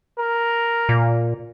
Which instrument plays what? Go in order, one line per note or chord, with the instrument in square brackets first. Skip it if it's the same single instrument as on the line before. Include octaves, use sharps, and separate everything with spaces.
[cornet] A#4
[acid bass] A#2